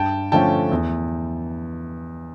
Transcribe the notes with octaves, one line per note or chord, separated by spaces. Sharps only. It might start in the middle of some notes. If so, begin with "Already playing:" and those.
Already playing: G2 G5 A5
D3 F3 A3 C#4 G5 A5
E2